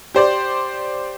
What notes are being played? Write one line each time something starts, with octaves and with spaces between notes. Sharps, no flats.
G4 C5 D5